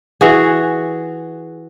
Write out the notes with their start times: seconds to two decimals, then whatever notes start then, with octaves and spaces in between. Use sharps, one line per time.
0.21 E3 F#4 G#4